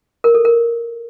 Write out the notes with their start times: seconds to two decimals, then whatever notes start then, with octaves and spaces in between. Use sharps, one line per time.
0.24 A#4
0.35 A4
0.45 A#4